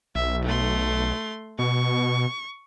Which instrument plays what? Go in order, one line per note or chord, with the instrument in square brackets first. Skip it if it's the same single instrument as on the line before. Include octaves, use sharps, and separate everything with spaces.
[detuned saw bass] B1 [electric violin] E5
[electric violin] A3 C6
[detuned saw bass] B2 [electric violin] C#6